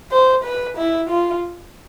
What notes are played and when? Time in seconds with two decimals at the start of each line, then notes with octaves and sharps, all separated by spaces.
0.12 C5
0.44 B4
0.77 E4
1.10 F4